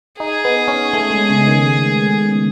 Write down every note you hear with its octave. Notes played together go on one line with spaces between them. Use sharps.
D#4 G#4
B3
C#4
A3
G#3
C#3
D#3